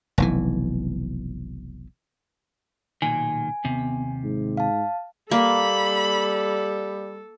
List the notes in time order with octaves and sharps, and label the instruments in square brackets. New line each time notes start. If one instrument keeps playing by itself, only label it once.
[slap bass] F1 B1 E3
[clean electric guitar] B1 A#2 D#3 [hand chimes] G#5
[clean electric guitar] D#2 C3 [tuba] B3
[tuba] G#2
[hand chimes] F5 A5
[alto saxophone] G3 [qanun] A#3 [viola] A4 [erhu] B5